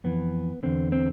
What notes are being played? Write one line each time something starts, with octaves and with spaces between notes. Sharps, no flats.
F2 E3 B3
E2 D3 C4
C4